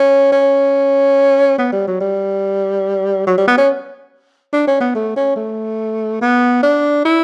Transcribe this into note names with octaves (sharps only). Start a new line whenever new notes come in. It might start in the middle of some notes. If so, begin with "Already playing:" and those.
Already playing: C#4
C#4
B3
G3
F#3
G3
F#3
G3
B3
C#4
D4
C#4
B3
A3
C#4
A3
B3
D4
E4